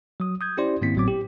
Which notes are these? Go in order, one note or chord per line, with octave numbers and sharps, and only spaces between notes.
F#3 D#6
D#6 G6 G#6
C#4 E4 G4 C5 D5 C6
G#2 D#3 A#3 C4 E4 B6
G#1 A2 F#3 B3 C4 D6
G4